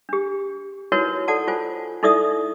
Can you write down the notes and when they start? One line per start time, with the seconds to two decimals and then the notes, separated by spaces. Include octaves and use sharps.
0.09 D4 G4
0.92 D#4 E4 F#4 A#4 B4 C#5
1.28 A4 D5 F#5 A5
1.48 F4 C5 G#5
2.03 D#4 E4 A4 D5 E5 D#6